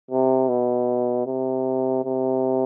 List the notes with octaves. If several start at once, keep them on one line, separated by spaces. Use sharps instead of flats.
C3
B2
C3
C3